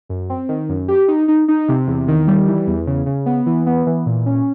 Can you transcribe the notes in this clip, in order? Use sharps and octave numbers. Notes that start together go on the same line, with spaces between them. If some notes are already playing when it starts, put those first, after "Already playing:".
F#2
C4
D#3
F#2
G4
D#4
D#4
D#4
C3
E2
D#3
G3
E3
E2
C#3
C#3
B3
E3
B3
E3
A#2
C#4